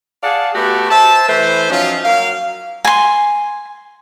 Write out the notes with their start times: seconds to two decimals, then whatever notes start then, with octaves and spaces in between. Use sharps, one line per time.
0.23 G#4 D5 F5 F#5 A5
0.54 A3 B3 F#4 G4
0.90 C5 E5 A5
1.28 E3 A3 B4 C5
1.70 F3 F#3 C#4 D#4 F4
2.04 F#3 A#3 F5
2.85 G#5 C6